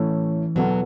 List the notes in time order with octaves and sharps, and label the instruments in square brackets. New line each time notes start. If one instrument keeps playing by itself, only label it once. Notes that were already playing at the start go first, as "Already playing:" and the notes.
Already playing: [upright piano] A2 A3 C#4 [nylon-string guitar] E3
[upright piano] E2 B2 B3 A4 [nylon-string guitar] F#3